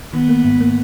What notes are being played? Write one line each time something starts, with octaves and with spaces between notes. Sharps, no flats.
D#3 B3
A#3
G#2
A#3